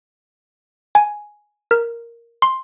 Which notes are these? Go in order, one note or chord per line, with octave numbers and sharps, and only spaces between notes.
G#5
A#4
C6